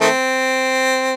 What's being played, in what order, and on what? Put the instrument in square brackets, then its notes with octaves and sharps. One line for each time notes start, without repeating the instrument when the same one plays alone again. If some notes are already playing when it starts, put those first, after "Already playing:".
[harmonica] D#3 A3 C4